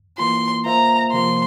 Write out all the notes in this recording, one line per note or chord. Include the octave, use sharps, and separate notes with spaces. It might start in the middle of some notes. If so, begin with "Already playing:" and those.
E3 A#3 F4 C6
A#3 F4 C5 E5 A#5
C3 F3 A#3 F4 C6